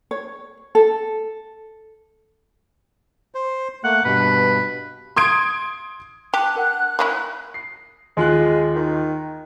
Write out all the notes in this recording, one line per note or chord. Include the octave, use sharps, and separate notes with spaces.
C#5
A4
C5
A3 A#3 F#5
G2 B2 B4
C6 D#6 G#6 D7
G4 A5 D6 F#6
D4 A#4 F#5
A#3 C#4 E4
C7
D#2 G#3 F4 F#6
D#3